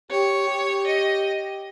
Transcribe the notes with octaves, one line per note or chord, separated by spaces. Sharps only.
G4 C#5
G4
D#5